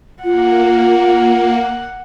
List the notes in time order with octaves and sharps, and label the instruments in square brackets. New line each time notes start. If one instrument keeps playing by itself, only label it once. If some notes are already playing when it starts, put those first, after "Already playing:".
[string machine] A#3 [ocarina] F4 [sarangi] F#5